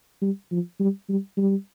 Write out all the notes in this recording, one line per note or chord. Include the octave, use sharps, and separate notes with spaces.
G3
F3
G3
G3
G3